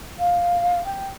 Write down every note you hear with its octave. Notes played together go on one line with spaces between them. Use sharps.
F5
G5